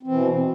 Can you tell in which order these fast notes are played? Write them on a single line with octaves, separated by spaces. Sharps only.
C4 E3 B2